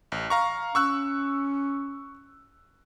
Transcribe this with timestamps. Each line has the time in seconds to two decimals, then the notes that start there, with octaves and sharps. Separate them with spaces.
0.12 A1
0.30 F5 A#5 C#6
0.75 C#4 C#6 E6 F#6